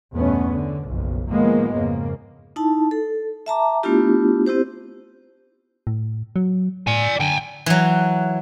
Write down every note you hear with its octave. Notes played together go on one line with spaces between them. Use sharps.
E2 G2 B2 A3 B3 C#4
D3
F#1 B1 F2
A2 D#3 F3 G#3 A#3 B3
F2 G#2 C#3 A#3
D#4 E4 A5
A4
E5 A5 A#5 D6
A3 B3 D4 E4 F4 G4
C4 E4 G4 C5
A2
F#3
A2 D5 G#5
D3 G5 G#5
E3 F#3